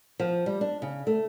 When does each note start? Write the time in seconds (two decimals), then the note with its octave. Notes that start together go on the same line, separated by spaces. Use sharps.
0.20 F3
0.46 G3
0.61 D4
0.82 C#3
1.07 A3